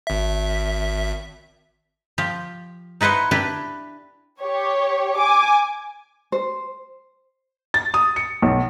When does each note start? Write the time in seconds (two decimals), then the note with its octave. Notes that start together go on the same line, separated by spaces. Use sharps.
0.07 G#1 E5
2.18 F3 G4
3.01 D#4 E4 B4 C5 F#5
3.31 D4 E4 G4 B4
4.42 G4 C#5
5.18 G#5 D6
6.32 C5
7.74 A6
7.94 D#6
8.16 C#7
8.42 B1